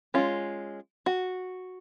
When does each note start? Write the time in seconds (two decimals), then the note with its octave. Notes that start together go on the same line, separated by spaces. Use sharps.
0.14 G#3 C#4 F4
1.06 F#4